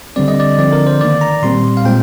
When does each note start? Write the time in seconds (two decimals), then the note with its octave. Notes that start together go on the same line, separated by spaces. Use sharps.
0.16 D3 G3 C4 D5
0.28 D#5
0.40 D5
0.58 D3 F3 C4 D5
0.73 A#4
0.87 C5
1.01 D#3 A#3 D5
1.21 A#5
1.43 A#2 G3 C4 C6
1.77 F5
1.85 A#2 G#3 C4 G5